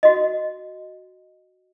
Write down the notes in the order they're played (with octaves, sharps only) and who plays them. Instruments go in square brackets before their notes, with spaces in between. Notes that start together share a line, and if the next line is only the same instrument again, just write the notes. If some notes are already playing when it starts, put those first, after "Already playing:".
[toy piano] F#4 D#5